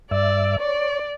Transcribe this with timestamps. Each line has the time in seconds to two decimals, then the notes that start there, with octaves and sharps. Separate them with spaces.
0.11 G2 D5 E5
0.60 C#5 D5